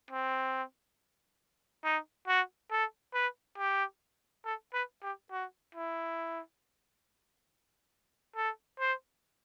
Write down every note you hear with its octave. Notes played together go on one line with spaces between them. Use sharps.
C4
D#4
F#4
A4
B4
G4
A4
B4
G4
F#4
E4
A4
C5